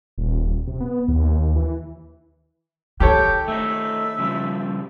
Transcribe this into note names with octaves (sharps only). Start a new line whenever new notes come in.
D#1
C3
B3
D#2
E3
D#3 G4 A4 C#5 G5
A3 D#4 E5
C#3 F3 G3